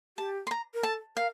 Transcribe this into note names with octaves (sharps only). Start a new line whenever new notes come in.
G4 A5
C6
A#5
A#4
A4 A5
A#4 F5